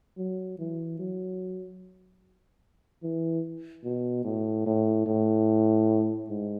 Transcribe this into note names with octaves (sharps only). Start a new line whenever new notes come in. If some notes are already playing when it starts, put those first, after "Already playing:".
F#3
E3
F#3
E3
B2
A2
A2
A2
G#2